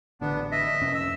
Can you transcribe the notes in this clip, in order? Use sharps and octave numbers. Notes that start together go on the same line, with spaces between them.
A1 D3 B3 D4
D#5 E5
F2 C3 C#4
E6